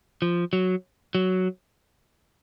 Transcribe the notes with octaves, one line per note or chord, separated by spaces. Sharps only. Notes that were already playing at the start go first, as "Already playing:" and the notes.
F3
F#3
F#3